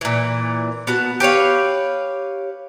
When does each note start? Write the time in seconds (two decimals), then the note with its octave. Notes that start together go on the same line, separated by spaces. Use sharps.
0.01 A#2 E3
0.87 B3 F#4 A5
1.20 G4 B4 C#5 F5